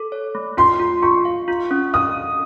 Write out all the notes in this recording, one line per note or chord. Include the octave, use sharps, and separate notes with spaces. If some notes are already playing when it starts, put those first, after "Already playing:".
Already playing: A4
C#5
A3
F4 C6
F4
F4 C#6
F5
F4
C#4
F5 D#6